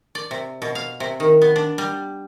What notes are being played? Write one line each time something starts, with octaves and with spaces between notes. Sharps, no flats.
D5
C3
B2
F5
C3
D#3
B3
D4
G3